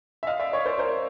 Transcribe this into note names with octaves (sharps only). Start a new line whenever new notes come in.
E5
D#5 F5
D5 E5
C#5 D#5
C5 D5
A#4 C5